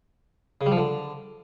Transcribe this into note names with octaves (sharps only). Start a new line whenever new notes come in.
C#3
G3
F3
D3